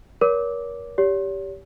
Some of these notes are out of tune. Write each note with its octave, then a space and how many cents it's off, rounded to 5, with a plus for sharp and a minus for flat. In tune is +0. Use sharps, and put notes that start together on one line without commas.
A#4 +35 C#5 +35 D6 +0
G4 +0 C#5 +40